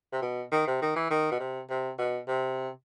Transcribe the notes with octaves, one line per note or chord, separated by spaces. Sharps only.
C3
B2
D#3
C3
D#3
E3
D#3
B2
C3
C3
B2
C3